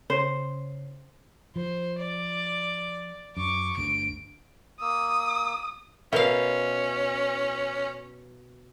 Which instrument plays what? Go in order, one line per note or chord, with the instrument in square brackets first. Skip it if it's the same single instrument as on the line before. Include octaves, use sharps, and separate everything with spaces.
[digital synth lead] C#3 [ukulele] C5
[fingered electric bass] F3 [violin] C5
[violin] D5
[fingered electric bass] F#2 [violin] C#6 D6
[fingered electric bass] G1 D2 D3 [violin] D7
[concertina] A#3 E6 [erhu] D#6
[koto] B2 F5 [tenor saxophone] C#4 [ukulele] A#4 E5